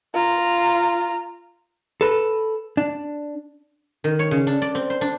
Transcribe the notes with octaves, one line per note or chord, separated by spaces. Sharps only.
F4 A#5
A4 B4
D4
D#3
C#5
C#3
D4
D5
C4
C5
D4